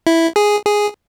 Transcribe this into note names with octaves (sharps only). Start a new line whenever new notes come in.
E4
G#4
G#4